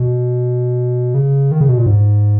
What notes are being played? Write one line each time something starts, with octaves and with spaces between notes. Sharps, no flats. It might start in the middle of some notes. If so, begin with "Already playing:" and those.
Already playing: B2
C#3
D#3
C#3
B2
A#2
G#2